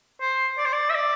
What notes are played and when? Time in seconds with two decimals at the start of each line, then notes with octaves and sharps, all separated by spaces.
0.21 C5
0.58 D5
0.65 C5
0.73 D5
0.90 E5
0.95 D5